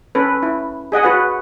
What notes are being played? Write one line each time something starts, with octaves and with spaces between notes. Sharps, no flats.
C#4 A4 B4
E4
G#4 D#5 F#5 G#5
F#4 B4 F#5